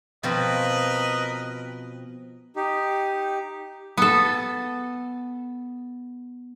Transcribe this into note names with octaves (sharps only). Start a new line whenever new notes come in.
B2 F3 C4 A#4 B4 D#5
D#4 G4
B3 A4